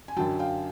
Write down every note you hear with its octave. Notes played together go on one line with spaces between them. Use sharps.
G#5
F#2 D3 F#3 G5 A5
F5 G5